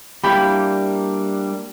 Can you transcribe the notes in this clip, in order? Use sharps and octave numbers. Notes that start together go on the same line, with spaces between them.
G3 A#3 D4 E4 G4 B5